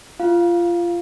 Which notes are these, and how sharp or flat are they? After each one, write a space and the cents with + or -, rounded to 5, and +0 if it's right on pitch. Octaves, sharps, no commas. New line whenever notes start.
F4 -20 F5 +0